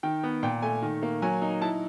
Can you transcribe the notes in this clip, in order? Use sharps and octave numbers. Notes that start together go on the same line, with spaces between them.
D#3 G5
B3
A#2 G5
A3 G#5
D#3
A#3
F#3 G#5
D#4
E4 A5